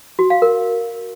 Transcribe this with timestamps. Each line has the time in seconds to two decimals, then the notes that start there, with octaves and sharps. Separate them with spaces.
0.19 F#4
0.30 F5
0.42 A#4